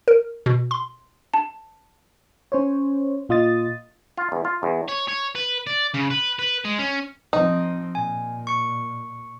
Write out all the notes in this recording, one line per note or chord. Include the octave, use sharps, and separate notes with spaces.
A#4
B2
C6
A5
C#4 C5 C#5
A#2 F4 D#5 D#6 A6
F4
E2
F4
E2
C#5
C#5
B4
D5
C#3
B4
B4
G#3
C#4
F3 C4 D#4
A#2 G#5
C#6 C#7